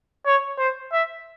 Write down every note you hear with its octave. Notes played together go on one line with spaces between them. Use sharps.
C#5
C5
E5